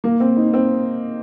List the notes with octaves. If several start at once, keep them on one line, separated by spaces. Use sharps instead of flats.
A#3
C4
D#4
C4